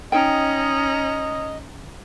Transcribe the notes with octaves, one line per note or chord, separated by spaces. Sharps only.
C#4 D#4 D#5 G5 A#5